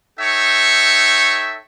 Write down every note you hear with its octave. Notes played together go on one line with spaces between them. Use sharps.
D#4 A4 C#5 E5 G5 C#6